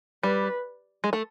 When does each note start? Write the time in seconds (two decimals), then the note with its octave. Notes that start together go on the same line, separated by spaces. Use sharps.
0.23 G3 B4
1.04 G#3
1.13 A3